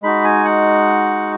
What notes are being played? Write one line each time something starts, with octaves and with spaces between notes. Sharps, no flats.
G#3 D#4 F#4 B5
G#5
F#5